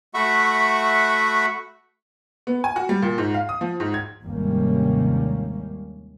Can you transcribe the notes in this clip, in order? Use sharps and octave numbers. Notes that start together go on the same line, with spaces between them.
A3 F#4 E5 F#5 B5 C#6
B3
G#5
F#4
G3
A#2
G#2
F5
D#6
F3
G#2
G#6
G#1 D#2 C3 G3 A#3 C#4